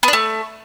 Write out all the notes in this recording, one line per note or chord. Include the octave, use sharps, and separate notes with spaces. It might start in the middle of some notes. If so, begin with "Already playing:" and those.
B3
D4
A3